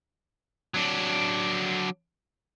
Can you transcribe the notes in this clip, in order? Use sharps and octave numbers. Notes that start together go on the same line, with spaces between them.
F#3 D4